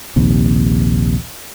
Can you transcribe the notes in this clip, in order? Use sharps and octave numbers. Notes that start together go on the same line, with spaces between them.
A#1 D#2 C3